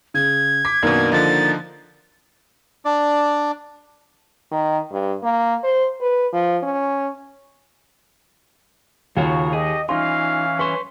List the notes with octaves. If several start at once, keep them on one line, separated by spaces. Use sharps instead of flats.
C#3 G#6
D6 B6
F#2 B2 D#3 A#3 D4
D3 F3 D#4 A6
D4 D5
D#3
G2
A#3
C5
B4
F3
C#4
D#2 C#3 F4 F#4 A#4 C#5
G4 G#4 D#5
E3 C#4 D#4 F4 F5 C6
B4 C#5 C6 C#6